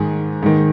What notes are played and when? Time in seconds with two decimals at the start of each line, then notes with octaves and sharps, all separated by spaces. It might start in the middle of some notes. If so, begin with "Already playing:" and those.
Already playing: G#2 D#3 G#4
0.43 G#2 D#3